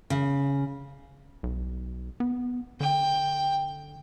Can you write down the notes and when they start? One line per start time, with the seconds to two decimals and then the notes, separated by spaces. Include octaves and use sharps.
0.10 C#3
1.43 B1
2.20 B3
2.80 D3 G5